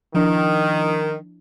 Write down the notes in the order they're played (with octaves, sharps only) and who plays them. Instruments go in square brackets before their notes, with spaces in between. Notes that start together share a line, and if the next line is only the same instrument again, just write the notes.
[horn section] D#3 [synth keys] F3 D4 E4